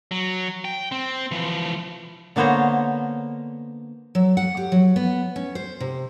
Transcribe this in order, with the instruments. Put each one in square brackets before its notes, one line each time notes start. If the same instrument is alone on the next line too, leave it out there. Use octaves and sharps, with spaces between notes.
[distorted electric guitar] F#3
G5
C4
E3 F3
[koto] D3 A#3 B3 C5 C#5 A#5
[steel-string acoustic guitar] F#3
F#5
G4
F#3
B3
C#4
C5
C3